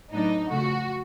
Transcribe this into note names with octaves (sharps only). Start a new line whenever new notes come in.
A2 F#3 B3 D4 D#4
F2 C#3 F3 A3 F#4